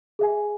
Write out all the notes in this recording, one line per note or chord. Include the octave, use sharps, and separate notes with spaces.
G#4 E5 G#5